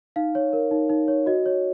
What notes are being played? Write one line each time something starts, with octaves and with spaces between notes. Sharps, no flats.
D#4 F5
C#5
A#4
D#4
D#4
C#5
F#4 D#5
C#5